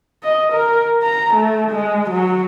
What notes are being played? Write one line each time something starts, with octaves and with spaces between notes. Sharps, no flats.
D#5
A#4
A#5
A3
G#3
F#3